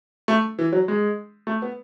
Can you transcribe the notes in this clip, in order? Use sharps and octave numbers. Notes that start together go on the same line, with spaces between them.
A3
E3
F#3
G#3
A3
B3